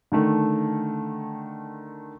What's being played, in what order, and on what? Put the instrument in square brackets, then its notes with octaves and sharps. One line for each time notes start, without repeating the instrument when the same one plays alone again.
[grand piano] D3 D#3 A3